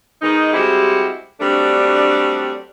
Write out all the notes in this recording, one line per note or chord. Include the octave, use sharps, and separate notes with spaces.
D#3 G#3 B3 D#4
G3 G#3 C4 E4 F#4 G4
F#3 G3 A3 C4 D4